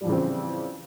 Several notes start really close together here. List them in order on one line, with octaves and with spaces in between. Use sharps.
G3 F3 E3 C#3 C4